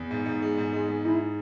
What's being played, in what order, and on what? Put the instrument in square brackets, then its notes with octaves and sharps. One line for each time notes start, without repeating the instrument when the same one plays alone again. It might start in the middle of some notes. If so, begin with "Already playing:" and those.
Already playing: [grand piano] E2
G#2
G#2
G#3
G#2
G#3
G#3
[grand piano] G#2 [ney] E4